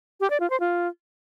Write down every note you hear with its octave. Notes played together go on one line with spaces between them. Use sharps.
G4
D5
F4
C5
F4